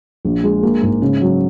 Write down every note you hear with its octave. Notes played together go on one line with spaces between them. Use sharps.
A#1
G#3
A#3
G#2
C#3
F#3